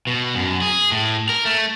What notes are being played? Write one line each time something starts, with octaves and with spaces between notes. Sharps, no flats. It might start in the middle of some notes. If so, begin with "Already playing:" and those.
B2
F#2
G#4
A2
A#4
A3